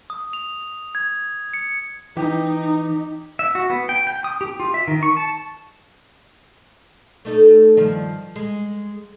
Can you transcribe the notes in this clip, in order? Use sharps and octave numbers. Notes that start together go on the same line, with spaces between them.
D#6
F7
G#6
C#7
E3 D#4 G4
E5
F#4
B3
G5
G5
D#6
G4
F4
E5
D#3
C#6
A5
A3 D#4 A4
G2 D#3 F3
G#3